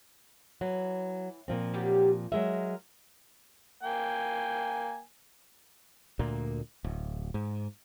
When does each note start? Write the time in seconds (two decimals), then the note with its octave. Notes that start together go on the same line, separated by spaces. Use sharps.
0.61 E3 F#3
1.48 A#2 F3 C4
1.74 F#3 G3 G4
2.32 F#3 G#3 A#4 E5
3.82 A#3 G5 G#5
6.19 D2 A#2 A#3
6.84 D1
7.34 G#2